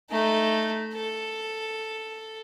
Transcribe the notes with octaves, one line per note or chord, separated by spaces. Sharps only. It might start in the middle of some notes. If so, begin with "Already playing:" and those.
A3 D#4
A4